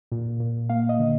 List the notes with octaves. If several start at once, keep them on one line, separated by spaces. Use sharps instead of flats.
A#2
A#2
A#3 F5
D#5
D3